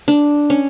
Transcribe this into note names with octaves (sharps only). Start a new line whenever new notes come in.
D4
C#4